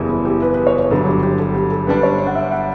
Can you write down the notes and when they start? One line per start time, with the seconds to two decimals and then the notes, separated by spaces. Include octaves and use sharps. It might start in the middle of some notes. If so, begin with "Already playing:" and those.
Already playing: F#1 E2 C#3 E3 G3
0.09 E4
0.25 G4
0.42 B4
0.54 B4
0.67 C#5
0.79 B4
0.90 G1 G2 D3 F#3 A4
1.06 G4
1.23 G4
1.39 A4
1.55 G4
1.71 A4
1.87 G2 D3 G3 D4 B4
2.03 C#5
2.26 F#5
2.35 E5
2.51 F#5